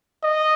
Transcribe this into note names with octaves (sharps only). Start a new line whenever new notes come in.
D#5